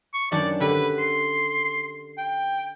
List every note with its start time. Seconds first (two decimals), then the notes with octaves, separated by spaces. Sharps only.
0.14 C#6
0.32 F#2 D#3 D4 D5
0.60 D3 G4 B4
0.98 C6
2.18 G5